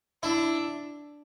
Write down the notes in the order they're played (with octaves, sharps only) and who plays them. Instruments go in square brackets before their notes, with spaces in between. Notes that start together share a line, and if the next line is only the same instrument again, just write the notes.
[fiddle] D4 [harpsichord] E4